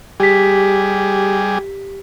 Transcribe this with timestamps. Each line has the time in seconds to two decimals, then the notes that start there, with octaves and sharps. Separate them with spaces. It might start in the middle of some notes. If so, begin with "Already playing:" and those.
0.20 G3 G4 G#4 B6